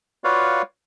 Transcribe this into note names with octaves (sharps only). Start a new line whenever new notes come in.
F4 F#4 B4 C#5 D5 F5